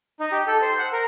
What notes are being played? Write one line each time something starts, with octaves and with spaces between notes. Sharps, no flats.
D#4
G4
A4
C5
F#5
A#4